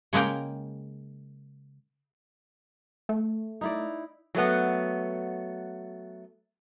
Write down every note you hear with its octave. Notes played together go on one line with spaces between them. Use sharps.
C#3 G#3 A#3 A#4 G5
A3
D#4 E4 D5
F#3 A3 B3